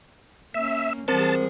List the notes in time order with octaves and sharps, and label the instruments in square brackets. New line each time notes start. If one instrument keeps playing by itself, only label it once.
[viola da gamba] A#3 C#4 [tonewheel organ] E5
[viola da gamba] E3 G3 G#4 [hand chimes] C4 A#4 C5 [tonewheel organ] A5